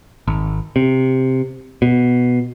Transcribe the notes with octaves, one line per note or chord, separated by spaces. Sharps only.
G#1
C3
B2